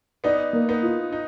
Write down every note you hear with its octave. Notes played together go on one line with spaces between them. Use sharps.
B3 D#4 D5
A#3
B3 D#4
F4
D#4